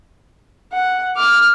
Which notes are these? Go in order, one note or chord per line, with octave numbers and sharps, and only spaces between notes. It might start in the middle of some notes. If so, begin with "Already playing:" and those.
F#5
D6 F6